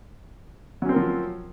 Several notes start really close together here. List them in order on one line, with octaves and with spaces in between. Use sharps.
F#3 C#4 C4 A#4 F3